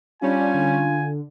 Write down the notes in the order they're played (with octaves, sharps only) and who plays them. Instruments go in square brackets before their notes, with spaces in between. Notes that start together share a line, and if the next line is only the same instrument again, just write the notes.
[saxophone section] G3 C#4 [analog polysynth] D4 [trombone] F4 [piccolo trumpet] G#5
[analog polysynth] D3